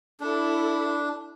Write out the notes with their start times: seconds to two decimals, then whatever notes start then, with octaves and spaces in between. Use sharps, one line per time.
0.20 D4 E4 A4